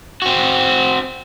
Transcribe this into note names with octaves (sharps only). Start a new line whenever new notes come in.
C4 F#4